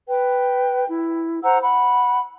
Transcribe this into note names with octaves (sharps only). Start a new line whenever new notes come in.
B4 G5
E4
C5 F#5 A#5 E6
F#5 B5